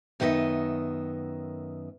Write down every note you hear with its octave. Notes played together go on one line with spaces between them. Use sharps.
F#2 D#3 B3 E4 D#5 E5